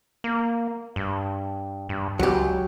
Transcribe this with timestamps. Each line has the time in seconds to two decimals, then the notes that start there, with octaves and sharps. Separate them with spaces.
0.24 A#3
0.96 G2
1.89 G2
2.19 C#2 F#3 G4